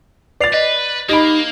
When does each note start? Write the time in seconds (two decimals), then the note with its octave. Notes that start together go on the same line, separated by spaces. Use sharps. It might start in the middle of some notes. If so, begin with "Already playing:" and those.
0.40 B4 D5 A6 C7 F7
0.54 B4 D#5
1.09 A#3 D#4 G4 D#5 B5